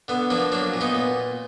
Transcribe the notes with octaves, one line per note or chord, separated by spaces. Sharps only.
D3 B3
F3 A#3 D4
F#3 A#3 D4
A#2
B3 D#4
A#2